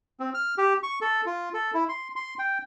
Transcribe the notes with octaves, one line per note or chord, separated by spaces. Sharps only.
C4
F6
G4
C#6
A4
F4
A4
E4
C6
C6
G5